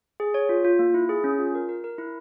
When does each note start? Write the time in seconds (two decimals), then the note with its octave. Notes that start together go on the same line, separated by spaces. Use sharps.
0.20 G#4
0.34 C#5
0.49 F4
0.65 F4
0.79 A#3
0.94 E4
1.09 G#4
1.24 C#4
1.39 F4
1.55 A#4
1.69 A#4
1.84 A#4
1.98 E4